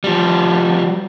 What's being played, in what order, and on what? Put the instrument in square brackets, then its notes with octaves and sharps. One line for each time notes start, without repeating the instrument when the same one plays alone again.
[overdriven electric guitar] F3 G3